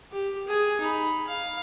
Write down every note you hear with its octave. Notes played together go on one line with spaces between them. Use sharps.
G4
G#4 G#5
D#4 B5
F5